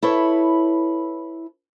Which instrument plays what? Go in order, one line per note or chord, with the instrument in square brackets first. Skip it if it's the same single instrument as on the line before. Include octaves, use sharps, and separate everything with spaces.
[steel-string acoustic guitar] E4 A4 B4 C#5